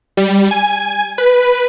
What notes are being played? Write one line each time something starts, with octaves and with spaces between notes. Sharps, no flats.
G3
G#5
B4